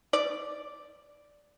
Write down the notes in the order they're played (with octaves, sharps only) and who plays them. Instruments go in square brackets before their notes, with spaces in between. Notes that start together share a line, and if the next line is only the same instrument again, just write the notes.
[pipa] D5